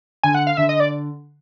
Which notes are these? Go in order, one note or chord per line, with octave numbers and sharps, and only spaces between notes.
D3 G#5
F#5
F5
D3 E5
D#5
D5